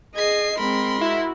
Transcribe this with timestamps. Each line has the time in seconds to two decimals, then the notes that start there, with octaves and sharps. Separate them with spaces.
0.15 G#4 D#5 G#6 C7
0.58 G#3 C4 A#4 B5 C6
1.01 E4 F#4